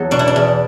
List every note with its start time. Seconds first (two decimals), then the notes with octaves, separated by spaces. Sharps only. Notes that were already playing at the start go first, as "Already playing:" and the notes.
Already playing: E2 F#3 A4
0.11 B2 D4
0.19 E4
0.28 D4
0.36 E2